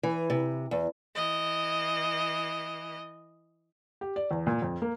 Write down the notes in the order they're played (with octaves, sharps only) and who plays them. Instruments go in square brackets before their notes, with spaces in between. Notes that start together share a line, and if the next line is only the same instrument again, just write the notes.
[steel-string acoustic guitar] E3
C3
E2
[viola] E3 D#5
[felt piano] G4
D5
E2
A#2
F2
A#3